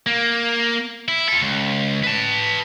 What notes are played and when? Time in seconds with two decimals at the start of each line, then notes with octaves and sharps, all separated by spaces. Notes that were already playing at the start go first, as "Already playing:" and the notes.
0.06 A#3
1.08 E4
1.28 F4 A4
1.41 C#2
2.03 B4 A5